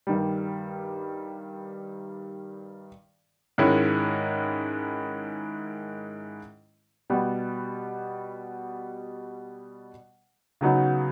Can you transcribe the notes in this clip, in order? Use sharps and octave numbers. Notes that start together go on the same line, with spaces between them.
G2 D#3 G3
G#2 D#3 G#3 C#4 E4
B2 G3 B3
C#3 F#3 B3 D#4